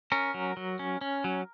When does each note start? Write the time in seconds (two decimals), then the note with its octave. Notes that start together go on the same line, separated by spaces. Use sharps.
0.12 C#4 A#4
0.34 F#3
0.57 F#3
0.79 C#4
1.01 C#4
1.24 F#3